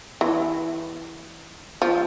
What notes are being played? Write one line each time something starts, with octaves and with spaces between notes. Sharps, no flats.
E3
F3